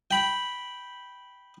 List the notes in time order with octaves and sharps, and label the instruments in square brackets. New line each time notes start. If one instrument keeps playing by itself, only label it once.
[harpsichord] G5 B5